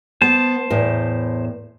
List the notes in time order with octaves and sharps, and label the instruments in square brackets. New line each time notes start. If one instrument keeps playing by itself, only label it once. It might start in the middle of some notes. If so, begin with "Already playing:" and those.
[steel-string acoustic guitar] B3 [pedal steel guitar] C5 A5
[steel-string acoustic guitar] E2 A2